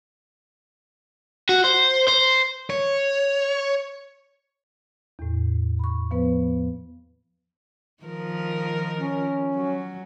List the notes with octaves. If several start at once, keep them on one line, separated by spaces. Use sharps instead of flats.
F#4
C5
C5
C#5
E2 A2
B5 C#6
F3 B3 B4 C5
D#3 F3 A#4
C#4
F#3